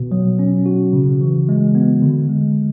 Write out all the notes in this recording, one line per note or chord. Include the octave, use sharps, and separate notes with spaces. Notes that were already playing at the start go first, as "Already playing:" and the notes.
Already playing: B2
F#3
C#4
F#4
C#3
E3
G#3
B3
D3
G#3